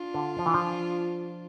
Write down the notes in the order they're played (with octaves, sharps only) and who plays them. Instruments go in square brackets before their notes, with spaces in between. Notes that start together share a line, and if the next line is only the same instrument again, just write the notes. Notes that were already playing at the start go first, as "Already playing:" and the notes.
Already playing: [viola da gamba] D4 F4
[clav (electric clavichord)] D3
F3
E3
F3